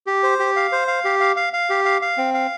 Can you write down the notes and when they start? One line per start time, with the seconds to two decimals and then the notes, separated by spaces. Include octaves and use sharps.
0.07 G4
0.23 C5
0.39 G4
0.56 F5
0.72 C5
0.88 F5
1.05 G4
1.21 F5
1.36 F5
1.53 F5
1.70 G4
1.85 F5
2.02 F5
2.18 C4
2.34 F5